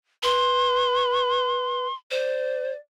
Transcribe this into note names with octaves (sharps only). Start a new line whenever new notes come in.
B4 C6
C5 D5